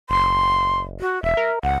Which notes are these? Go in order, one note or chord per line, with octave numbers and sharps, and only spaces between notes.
F#1 C6
F#4
E1 E5
A#4
C#2 F#5